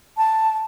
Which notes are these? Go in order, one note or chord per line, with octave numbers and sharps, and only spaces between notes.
A5